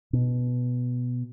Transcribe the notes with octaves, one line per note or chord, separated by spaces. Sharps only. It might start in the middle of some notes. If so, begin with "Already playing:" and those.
B2